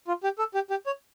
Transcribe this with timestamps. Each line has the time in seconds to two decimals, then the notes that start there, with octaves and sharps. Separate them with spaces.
0.08 F4
0.24 G4
0.39 A4
0.54 G4
0.70 G4
0.86 C#5